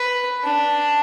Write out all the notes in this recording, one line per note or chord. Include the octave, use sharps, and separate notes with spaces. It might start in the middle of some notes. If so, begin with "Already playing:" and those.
Already playing: B4
D4